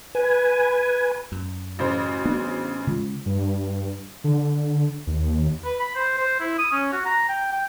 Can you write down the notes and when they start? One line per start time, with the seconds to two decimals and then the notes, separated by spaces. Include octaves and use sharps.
0.15 B4 G#5
1.32 F#2
1.79 A1 C#3 F#4 C5
2.25 B3 D4
2.87 C#3 G#3 F4
3.26 G2
4.24 D3
5.07 D#2
5.65 B4
5.79 B5
5.96 C5
6.17 C5
6.40 E4
6.58 D#6
6.72 C#4
6.92 F#4
7.05 A#5
7.29 G5
7.52 G5